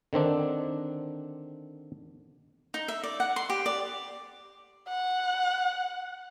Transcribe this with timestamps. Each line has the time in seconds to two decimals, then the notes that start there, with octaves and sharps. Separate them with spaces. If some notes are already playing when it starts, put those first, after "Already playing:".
0.13 D3 D#3 C4 D4
2.74 D#4
2.88 E5
3.04 D5
3.20 F#5
3.36 C6
3.50 G4
3.66 D5
4.88 F#5